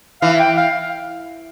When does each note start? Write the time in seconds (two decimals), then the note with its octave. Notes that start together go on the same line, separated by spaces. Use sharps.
0.21 E3 F5
0.39 G5
0.57 F5